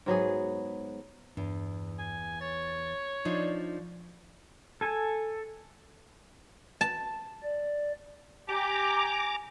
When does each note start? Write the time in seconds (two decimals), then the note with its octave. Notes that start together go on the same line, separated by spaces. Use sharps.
0.06 G#2 F#3 B3 G#4
1.37 E2 G2
1.99 G#5
2.41 C#5 A6
3.25 F3 D4 D#4 D5
4.81 A4 G#5
6.81 A5
7.43 D5
8.49 G4 G#5 A#5 D6